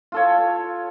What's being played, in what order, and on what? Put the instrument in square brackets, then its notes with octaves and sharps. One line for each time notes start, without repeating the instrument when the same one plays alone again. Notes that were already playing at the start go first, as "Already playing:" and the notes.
[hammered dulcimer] F4 A4 C#5